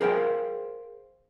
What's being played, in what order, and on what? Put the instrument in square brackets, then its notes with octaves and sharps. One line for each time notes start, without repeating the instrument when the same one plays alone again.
[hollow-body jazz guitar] G#4 A#4 C5 F5 G5